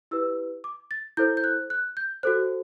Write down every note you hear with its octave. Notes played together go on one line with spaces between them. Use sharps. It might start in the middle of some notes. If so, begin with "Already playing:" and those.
E4 G4 B4 E6
D6
A6
E4 A4 C5 G6
G6
F#6
F#6
G6
F#4 A4 C5 F#6